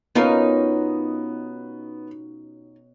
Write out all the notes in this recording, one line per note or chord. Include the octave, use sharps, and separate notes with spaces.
B2 B3 C#4 D#4 F4 F#4 A#4